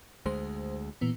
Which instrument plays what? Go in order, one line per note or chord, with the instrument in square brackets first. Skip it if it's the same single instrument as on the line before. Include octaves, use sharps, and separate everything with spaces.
[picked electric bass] D2 G#3 [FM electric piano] C5
[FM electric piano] A#2 E3 B3